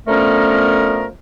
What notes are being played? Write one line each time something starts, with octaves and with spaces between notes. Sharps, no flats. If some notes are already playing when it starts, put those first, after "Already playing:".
D3 F3 A3 B3 C#4 A#4